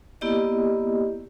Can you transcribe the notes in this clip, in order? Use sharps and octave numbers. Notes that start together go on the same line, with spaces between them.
A#3 B3 E4 G4 D5 D#5